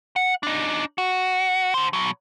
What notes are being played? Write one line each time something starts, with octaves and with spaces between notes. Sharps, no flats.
F#5
D4 D#4
F#4
D3 C5
B2 F#3